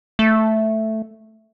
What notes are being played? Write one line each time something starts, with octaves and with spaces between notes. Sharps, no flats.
A3